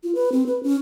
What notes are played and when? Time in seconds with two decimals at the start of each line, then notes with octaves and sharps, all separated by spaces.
0.04 F4
0.15 B4
0.32 C4
0.47 B4
0.63 C#4